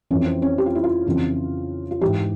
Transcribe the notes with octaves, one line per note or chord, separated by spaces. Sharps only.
F2 E3 C#4
C4
C#4
G4
F4
E4
F4
F2 C#3 E3
F4
G#2 E3 G4